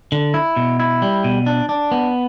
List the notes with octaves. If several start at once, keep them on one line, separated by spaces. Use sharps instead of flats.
D3
E4
B2
E4
G3
B2
D4
D4
B3